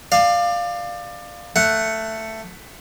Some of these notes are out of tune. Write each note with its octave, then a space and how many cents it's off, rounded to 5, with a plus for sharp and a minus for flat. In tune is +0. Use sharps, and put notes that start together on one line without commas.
D5 +25 F5 +0
A3 +10 F#5 +0